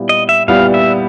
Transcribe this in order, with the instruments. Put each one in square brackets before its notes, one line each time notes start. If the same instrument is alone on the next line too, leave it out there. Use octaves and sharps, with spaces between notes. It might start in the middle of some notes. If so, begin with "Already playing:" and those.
Already playing: [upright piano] A#2 G3 B3 E4 G4
[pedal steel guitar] D#5
E5
[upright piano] A#2 G3 B3 E4 G4 [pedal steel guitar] F5
[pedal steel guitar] E5